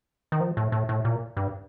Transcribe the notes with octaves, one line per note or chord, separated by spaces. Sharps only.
D#3
F3
A2
A2
A2
A#2
G2